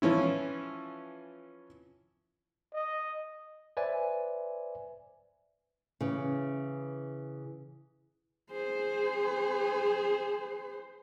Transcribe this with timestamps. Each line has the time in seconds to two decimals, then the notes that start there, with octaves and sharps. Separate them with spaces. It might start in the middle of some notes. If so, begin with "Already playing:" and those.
0.02 E3 F3 C#4 E4
2.73 D#5
3.77 B4 C5 D5 E5 G#5
6.01 C#3 E3
8.51 G#4 C5